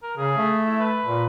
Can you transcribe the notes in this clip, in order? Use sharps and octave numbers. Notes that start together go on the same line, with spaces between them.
A#4
C#3 G#4
A3
E4
B4
A#2